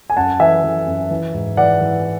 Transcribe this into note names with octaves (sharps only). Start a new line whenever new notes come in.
G#5
F#2 F#5 A5
E3 E5 G#5
E3
F#2
E3
G#2
E3 D5 F#5
E3